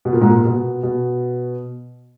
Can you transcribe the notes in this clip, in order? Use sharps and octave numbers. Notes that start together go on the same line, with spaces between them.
B2
A#2
G#2
A#2
B2
B2